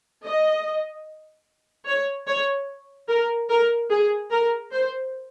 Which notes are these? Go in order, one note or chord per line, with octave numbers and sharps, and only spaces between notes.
D#5
C#5
C#5
A#4
A#4
G#4
A#4
C5